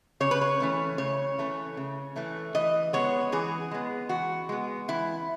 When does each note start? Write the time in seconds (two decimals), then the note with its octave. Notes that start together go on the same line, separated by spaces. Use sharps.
0.20 C#3 C#5
0.31 B4
0.41 C#5
0.60 E3 A3 C#4
0.98 C#3 C#5
1.38 E3 A3 C#4
1.77 C#3
2.16 E3 A3 C#4
2.55 E3 D#5
2.93 G#3 B3 C#5
3.32 E3 G#4
3.71 G#3 B3
4.09 E3 F#4
4.49 G#3 B3
4.88 E3 E4